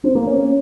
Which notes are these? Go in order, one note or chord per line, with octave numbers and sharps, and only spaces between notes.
C4
A#3
C#4